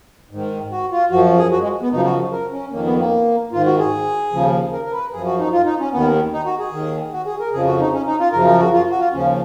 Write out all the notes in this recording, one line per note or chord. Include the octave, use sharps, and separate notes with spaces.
G#2 D#3
F#4
F4
F#2 F3 F#4
G#4
F#4
G#3
B3
F#2 C#3 F3 D#4
F#4
A#4
C#4
F2 D#3 A#3
B3
A#3
G#2 D#3 F4
F#4
G#4
D#2 C#3 F3
A#4
A#4
B4
F#2 F3 G#4
F#4
D#4
F4
D#4
C#4
D#2 D#3 B3
D#4
F#4
G#4
D#2 D#3
F#4
G#4
A#4
F2 C#3 F3 G#4
F#4
D#4
C#4
D#4
F4
F#2 C#3 F3 A#4
A#4
F#4
F4
F#4
F4
D#2 C#3 F3 C#4